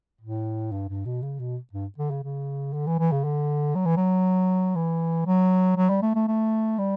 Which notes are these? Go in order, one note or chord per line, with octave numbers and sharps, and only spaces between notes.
A2
G2
G2
B2
C#3
B2
G2
D3
C#3
C#3
D3
E3
E3
C#3
D3
F#3
E3
F#3
E3
F#3
F#3
G3
A3
A3
A3
G3